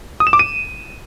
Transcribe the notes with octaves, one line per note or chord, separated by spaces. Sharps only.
D#6
E7
D6
D#7